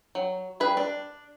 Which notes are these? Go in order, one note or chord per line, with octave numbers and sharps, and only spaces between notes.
F#3
G3 G#4 B4
D4